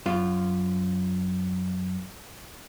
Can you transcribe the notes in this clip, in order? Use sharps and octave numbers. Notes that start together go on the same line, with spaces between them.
F#2 F4